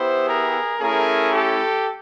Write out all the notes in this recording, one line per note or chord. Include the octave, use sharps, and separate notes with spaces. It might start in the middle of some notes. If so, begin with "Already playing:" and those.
Already playing: B3 E4 G4 C5
G#4 A#4
A3 C#4 E4 G#4 A#4
G4 A4